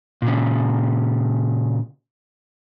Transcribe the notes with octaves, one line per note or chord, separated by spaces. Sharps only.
A#2 C#3